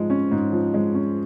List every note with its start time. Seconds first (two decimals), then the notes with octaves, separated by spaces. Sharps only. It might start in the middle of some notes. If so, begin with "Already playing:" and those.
Already playing: G#2 F3 G#3
0.10 C#4
0.32 G#2
0.52 F3
0.74 G#3
0.94 C#4